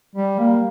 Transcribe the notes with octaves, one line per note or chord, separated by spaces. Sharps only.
G3
A#3